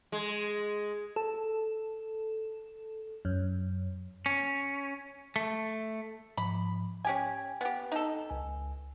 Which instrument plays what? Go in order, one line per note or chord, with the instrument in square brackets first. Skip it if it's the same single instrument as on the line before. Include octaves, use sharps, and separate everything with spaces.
[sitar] G#3
[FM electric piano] A4
F#2
[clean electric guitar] C#4
A3
[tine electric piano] G#2 F3 [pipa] B5
[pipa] C#4 G4 G#5 [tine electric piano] G5
[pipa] B3 G4
D#4 A4
[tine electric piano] C#2 G#5